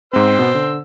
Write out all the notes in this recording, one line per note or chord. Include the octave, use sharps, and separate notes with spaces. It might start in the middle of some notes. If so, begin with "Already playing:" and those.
G#2 C4 C5 E6
B2 B3
D3